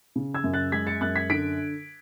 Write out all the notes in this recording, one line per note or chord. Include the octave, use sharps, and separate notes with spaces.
C#3
E6 G#6
F#2
F#6 A6
G#3 G#6 B6
A6 C#7
F#2 F#6 A6
G#6 B6
D3 B6 D7